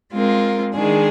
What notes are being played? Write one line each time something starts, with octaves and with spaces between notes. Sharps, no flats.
G#3 C4 F4 A#4
D#3 G#3 D4 G#4